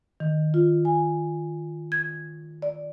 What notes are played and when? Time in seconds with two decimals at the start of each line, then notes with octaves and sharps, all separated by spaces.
0.20 D#3
0.54 F4
0.85 G#5
1.92 G#6
2.62 D5